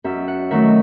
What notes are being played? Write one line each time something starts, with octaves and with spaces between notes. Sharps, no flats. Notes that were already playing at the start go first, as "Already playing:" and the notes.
F#2 E5
F#5
D#3 F#3 A3 E5